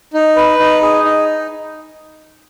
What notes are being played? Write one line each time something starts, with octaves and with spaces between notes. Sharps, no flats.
D#4
B4
D#4
G#4
D#4